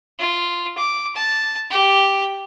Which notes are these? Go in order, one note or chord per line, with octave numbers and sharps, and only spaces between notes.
F4
D6
A5
G4